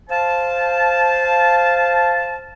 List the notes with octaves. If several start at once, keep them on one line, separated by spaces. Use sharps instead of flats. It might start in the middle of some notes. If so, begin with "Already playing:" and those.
C5 F5 A5